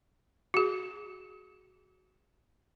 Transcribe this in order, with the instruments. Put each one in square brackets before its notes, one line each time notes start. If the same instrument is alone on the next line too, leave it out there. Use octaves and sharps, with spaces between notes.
[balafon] F#4 G#4